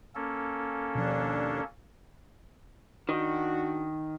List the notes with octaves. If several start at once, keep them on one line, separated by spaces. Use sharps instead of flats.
A#3 C#4 A4
D#2 B2 F3 D4
D#3 D4 F#4